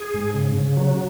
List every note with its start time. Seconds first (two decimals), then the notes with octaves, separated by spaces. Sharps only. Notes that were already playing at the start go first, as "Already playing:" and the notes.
Already playing: G#4
0.14 G#2
0.34 C#3
0.56 C#3
0.77 F#3